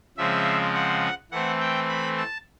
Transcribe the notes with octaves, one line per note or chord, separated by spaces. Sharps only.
C#3 F3 G#3 C4 E5
F#5
E3 A3 C4 F#5
G5
B5
A5